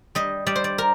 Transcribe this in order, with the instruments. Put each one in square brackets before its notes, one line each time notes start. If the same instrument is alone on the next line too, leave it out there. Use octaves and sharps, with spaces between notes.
[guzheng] G3 D#5
G3 D5
C5
D5
A#4